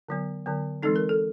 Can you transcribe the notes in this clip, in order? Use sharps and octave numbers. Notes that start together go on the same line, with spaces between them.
D3 F#3 B3
D3 F#3 B3
E3 G#3 C4 D#4 A4
A#4
A4